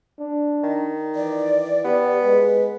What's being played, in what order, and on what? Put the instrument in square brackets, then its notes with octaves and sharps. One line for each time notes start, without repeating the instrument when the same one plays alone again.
[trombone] D4
[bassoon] D#3
[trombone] E3 [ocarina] D5
[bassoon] B3 [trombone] G4
[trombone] G#3 [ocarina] B4